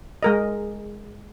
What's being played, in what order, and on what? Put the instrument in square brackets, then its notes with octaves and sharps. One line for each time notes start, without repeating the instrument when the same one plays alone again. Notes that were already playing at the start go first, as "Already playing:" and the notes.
[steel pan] G#3 A#4 D#5